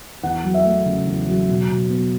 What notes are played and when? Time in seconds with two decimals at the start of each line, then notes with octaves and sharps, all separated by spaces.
0.23 E2 F#5
0.44 F#3
0.54 E5
0.65 A3
0.86 C#3
1.06 E2
1.28 F#3
1.48 B2
1.69 B2
1.90 B3